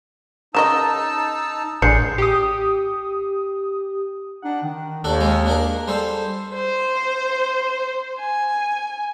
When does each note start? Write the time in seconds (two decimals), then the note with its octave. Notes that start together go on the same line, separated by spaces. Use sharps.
0.55 C#3 D#4 A#4 D#5 A5 D#6 E6 E7
1.82 A1 G#3 D4 G6 C7 C#7
2.18 G4 D#6
4.43 D4 D#4 F#5
4.63 D#3
5.04 D#2 D4 F#4 A4
5.20 G#3 C4 C#4
5.46 D4 G#4 A#4
5.88 G3 G#4 A4 C5
6.54 C5
8.20 G#5